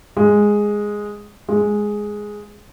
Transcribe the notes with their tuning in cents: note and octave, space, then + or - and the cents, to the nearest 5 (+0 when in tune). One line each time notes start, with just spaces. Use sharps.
G#3 -5
G#3 +0